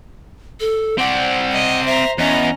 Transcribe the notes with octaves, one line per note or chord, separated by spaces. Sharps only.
A4
C4 D5 F#5
D#5
C5 E5 A#5
E2 C#4 D#5 A#5